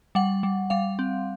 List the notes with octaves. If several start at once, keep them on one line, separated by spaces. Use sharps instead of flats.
G3 F#5
G3
G3 F5
C4